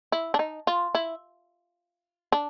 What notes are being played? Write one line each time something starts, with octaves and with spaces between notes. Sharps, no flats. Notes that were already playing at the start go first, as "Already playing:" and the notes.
E4
D4
D#4
F4
E4
D4